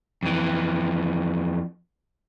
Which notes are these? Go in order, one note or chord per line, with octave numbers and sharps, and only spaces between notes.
F2 E3